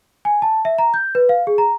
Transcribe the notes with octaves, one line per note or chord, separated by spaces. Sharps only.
G#5
A5
E5
A#5
G6
B4
F5
G#4
A#5